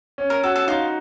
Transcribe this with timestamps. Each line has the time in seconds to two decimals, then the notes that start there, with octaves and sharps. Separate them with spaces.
0.18 C#4
0.30 A#4
0.43 F#4 A4
0.56 A4
0.68 D#4 F4